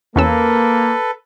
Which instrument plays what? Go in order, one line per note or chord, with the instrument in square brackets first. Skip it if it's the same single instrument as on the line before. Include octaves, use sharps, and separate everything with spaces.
[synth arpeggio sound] E2 C#4 E6 [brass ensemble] A#3 [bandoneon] A4 B4